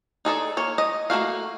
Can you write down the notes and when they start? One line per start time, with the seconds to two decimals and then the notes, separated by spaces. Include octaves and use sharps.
0.25 D#4 G#4 A4 D5
0.57 A#3 C#5
0.78 D#5
1.10 A3 A#3 F#4 F5